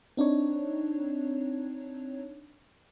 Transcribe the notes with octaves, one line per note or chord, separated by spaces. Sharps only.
C4 D4 D#4 C#5